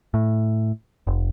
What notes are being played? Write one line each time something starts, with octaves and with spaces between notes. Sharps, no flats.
A2
F1